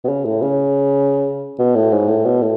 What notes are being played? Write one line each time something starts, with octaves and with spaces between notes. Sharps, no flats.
B2
C#3
A2
C#3
B2
A2
G#2
A2
B2
A2